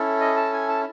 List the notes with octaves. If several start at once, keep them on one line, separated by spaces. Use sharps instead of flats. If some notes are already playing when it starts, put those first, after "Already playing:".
Already playing: C#4 E4 A4
D#5
A5
G#5
A5